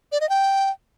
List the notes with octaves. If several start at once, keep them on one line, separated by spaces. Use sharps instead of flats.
D5
D#5
G5